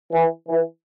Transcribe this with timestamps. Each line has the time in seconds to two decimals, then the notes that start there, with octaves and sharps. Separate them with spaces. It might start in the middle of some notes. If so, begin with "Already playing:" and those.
0.13 E3
0.48 E3